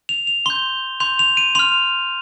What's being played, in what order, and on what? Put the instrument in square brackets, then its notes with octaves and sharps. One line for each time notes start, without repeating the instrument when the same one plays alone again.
[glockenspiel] F7
F7
C6 G6 G7
C6 G6 F7
F7
D#7
C6 F6 F7